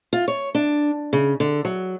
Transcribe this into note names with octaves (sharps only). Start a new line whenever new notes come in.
F4
C#5
D4
C#3
D3
F#3